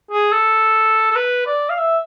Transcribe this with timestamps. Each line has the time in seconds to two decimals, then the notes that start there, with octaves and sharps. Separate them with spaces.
0.11 G#4
0.32 A4
1.11 A4
1.16 B4
1.47 D5
1.69 F5
1.78 E5